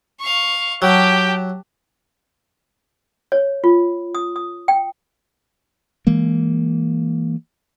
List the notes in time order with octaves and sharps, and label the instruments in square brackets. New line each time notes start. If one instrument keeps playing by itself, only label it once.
[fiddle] F5 C#6
[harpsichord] F#3 [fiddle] G4 A5 [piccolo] G5
[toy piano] C#5
F4
D#6
D#6
G5
[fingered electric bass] E3 G#3 A#3